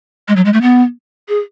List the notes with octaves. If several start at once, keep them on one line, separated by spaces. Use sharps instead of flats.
G#3
F#3
G#3
A3
B3
G#4